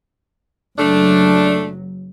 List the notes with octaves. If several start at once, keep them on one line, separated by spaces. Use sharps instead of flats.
F#1 F#3 A3 D4